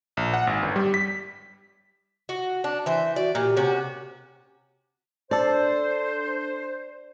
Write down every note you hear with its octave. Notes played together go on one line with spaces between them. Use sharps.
A#1
F#5
G#1
G1
G3
B6
F#4
D4
E3 C5 E5
F#4 D5
A#2 G4
C3 C#4 F#4
D4 A4 C5 D5